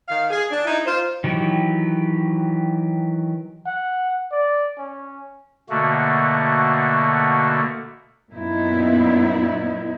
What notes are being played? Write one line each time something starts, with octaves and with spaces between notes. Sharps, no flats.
D#3 F5
G#4
D4
D#4 E4
F4 C5
D#3 E3 F#3 G4
F#5
D5
C#4
B2 D3 A3 A#3 F#4
F#2 A#2 F#3 B3 D#4 E4